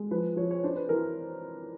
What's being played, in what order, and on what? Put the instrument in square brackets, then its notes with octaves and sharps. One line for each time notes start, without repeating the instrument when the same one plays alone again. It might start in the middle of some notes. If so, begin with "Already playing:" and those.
Already playing: [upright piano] G#3
F3 B4
F3 C#5
C#5
D4 C5
B4
E3 A#4